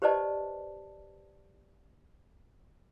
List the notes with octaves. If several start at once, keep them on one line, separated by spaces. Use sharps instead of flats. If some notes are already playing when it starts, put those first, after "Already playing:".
G4 B4 C5 D5 D#5 A5